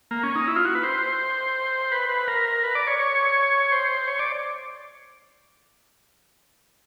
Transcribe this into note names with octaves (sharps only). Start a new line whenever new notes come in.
A#3
C#4
D#4
E4
F4
F#4
B4
C5
B4
B4
A#4
B4
D5
C#5
C#5
C5
C#5
D5